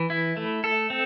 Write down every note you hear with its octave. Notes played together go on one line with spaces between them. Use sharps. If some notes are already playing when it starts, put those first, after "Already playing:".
Already playing: E3
E4
A3
A4
C4